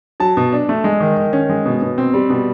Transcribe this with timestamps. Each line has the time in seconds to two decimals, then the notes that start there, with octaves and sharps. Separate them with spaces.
0.20 F#3 A5
0.37 B2
0.52 D4
0.69 A3
0.84 G#3
1.00 D#3
1.17 D#3
1.33 C#4
1.49 G#3
1.65 B2
1.82 B2
1.98 C4
2.14 G3
2.30 B2